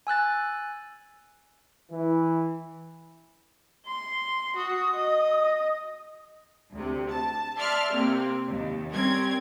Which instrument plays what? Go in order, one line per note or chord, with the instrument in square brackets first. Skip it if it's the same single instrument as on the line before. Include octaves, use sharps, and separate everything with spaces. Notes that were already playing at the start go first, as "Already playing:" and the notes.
[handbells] G#5 E6 F#6 A6
[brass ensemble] E3
[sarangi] C6
[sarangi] F#4 [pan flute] D#6
[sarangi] D#5
[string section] D2 C3
A5
D5 E5 A5 C6 F6
C3 A#3 C4
D#2
G3 C4 C#4 A#4 G#6